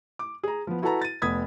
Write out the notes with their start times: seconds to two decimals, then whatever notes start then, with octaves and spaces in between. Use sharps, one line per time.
0.19 D6
0.43 G#4 A#5
0.67 F3 B3
0.82 E4 F#4 A4 B4 A5 A#5
1.01 A6 D#7
1.22 F1 B3 D#6 G#6 B6